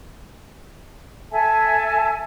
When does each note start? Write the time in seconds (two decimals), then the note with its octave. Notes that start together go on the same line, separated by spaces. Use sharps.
1.31 A4 E5 G#5 A5